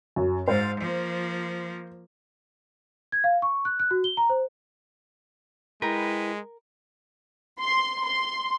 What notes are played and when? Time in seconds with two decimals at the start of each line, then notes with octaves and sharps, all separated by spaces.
0.16 F#2
0.48 G#2 C5 F5
0.79 F3 A#3
3.12 G#6
3.24 F5
3.42 C#6
3.65 F#6
3.80 F#6
3.91 F#4
4.04 G7
4.17 A#5
4.29 C5
5.82 G#3 E4 A#4 B4 G5
7.60 C6
8.05 C6